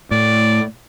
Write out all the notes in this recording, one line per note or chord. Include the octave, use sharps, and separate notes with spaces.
A2 D5